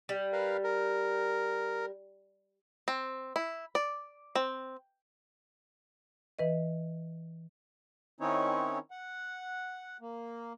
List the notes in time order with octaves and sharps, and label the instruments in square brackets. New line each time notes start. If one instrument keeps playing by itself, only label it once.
[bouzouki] G3
[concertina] A#4 B4 F5
A#4
[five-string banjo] C4
E4
D5
C4
[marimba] E3 B4 D#5
[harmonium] D#3 C4 C#4 D#4 E4 C#5
F#5
A#3